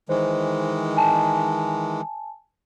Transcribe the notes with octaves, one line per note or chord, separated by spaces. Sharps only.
D#3 E3 G#3 C5
G#5 A5